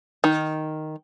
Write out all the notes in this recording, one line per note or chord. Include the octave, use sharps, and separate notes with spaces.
D#3